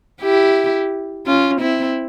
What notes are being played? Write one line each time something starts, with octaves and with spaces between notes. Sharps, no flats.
E4 G4
C#4 F4
C4 E4